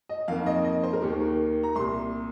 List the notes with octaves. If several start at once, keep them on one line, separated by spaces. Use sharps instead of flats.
D#5
F2 D#3 A#3 F5
D#5
D#5
C5
A#4
D#2 D#3 A#3 G4
A#4
A#5
C2 A#2 G3 C6